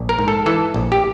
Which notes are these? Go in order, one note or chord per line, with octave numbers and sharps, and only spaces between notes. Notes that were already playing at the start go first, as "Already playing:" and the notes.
Already playing: A#1
A#4
G#2
A4
E3 A4
A#1
G4